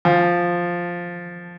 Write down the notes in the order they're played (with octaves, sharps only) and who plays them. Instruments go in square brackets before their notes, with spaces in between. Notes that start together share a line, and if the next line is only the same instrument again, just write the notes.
[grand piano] F3